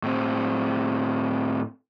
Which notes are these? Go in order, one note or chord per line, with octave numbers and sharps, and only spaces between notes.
A2 C4